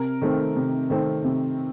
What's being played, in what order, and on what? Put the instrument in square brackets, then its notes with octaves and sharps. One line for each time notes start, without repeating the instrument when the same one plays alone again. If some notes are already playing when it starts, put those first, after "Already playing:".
Already playing: [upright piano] C3 A#4
D#3 A3 C4
C3
D#3 A3 C4
C3